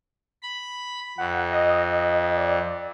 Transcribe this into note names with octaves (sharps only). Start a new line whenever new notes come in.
B5
F2 F#5
D#5
D5